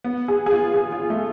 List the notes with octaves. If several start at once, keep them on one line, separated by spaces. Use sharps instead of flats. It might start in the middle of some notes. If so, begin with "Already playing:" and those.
B3
G#4
G#4
F4
G#4
F4
A3